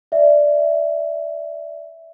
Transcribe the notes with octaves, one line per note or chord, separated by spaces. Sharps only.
D5 E5